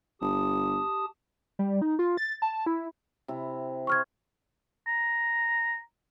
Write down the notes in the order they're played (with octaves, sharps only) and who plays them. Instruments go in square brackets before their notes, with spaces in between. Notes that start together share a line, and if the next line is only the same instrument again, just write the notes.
[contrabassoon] G1 [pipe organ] G4 A5 D#6
[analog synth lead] G3
D#4
F4
A6
A5
E4
[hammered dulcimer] C3 E4
[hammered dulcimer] C5 D#5 [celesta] C#6 F6 G#6
[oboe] A#5